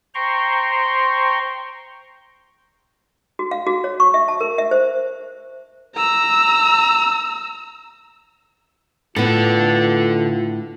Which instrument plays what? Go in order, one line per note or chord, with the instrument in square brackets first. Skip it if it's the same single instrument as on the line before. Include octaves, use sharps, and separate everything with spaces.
[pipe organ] C5 G5 A#5 C6 C#6
[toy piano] F#4
F5
F#4
C#5
C#6
E5
A5
A#4
E5
C5
[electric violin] A#5 E6
[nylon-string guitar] A2 B3 [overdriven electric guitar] D3 A4 [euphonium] F4